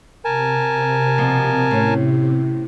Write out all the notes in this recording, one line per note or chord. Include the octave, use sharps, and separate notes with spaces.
C3 A#4 G#5 A5
B2 F3 A#3
A2 C#4